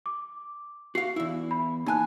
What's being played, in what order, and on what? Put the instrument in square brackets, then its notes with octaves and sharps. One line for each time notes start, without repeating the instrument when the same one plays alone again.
[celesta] D6
[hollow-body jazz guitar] F#4 F5 [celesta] C7
[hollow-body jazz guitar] E2 E4
[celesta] B5
[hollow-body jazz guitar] A#2 G#5 [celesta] D#4 A5 F#6